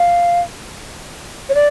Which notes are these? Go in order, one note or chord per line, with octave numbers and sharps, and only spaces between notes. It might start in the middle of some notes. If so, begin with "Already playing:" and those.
Already playing: F5
C#5
D5